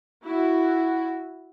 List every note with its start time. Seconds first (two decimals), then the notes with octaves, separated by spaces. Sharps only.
0.24 E4 F#4